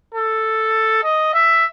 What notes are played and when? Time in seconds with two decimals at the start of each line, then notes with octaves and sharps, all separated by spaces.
0.14 A4
1.03 D#5
1.34 E5